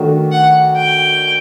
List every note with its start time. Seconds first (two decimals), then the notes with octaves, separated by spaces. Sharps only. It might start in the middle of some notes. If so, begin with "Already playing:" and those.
Already playing: D#3 A3 D4 F#4
0.32 F#5
0.76 G5